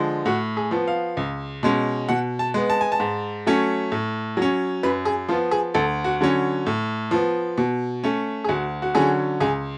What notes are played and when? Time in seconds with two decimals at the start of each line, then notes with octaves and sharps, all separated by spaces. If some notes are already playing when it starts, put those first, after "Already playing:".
Already playing: D3 F3 G#3
0.25 A2 F#4
0.57 G#4
0.71 F3 B3
0.88 F5
1.17 C#2
1.63 B2 G#3 C#4
2.09 B2 F#5
2.39 A5
2.54 G#3 B3
2.70 A5
2.81 G#5
2.92 A5
3.00 G#2
3.47 F#3 A3 C#4
3.92 A2
4.37 F#3 C#4
4.83 F#2 B4
5.05 G#4
5.29 F3 B3 F4
5.51 G#4
5.74 D2 A4
6.04 F#4
6.21 D3 F#3 C#4
6.67 A2
7.11 F3 B3
7.58 B2
8.04 A3 C#4
8.44 G#4
8.49 D2 F#4
8.82 F#4
8.95 D3 F#3 C#4 G#4
9.40 C#2 G#4